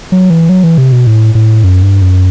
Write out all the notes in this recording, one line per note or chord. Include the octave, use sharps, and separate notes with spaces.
F#3
E3
F#3
E3
C3
B2
A2
A2
F#2
G2
F#2